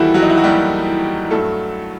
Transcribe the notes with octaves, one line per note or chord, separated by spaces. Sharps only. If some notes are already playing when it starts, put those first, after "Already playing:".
Already playing: D#2 D#3 E3 G3 E4 F#4 G4 A4
F#3 F#4
D#4
E4
F#4
D#2 D#3 G3 G4
G2 F#3 A3 A4